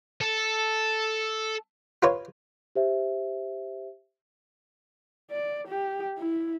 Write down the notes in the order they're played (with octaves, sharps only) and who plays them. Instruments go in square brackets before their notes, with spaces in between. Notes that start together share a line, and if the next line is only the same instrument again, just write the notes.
[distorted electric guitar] A4
[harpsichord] F4 B4 C#5
[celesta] G4 C5 E5
[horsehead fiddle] D5
G4
E4